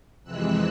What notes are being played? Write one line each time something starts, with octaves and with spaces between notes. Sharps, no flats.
F2 C3 E3 G#3 E6 F#6